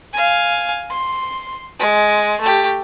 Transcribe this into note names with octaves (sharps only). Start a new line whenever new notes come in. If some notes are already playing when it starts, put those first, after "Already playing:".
F5 G#5
C6
G#3
A3 G4